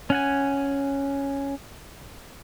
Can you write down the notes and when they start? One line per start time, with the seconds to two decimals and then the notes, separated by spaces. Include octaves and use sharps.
0.10 C#4 F#5 G#5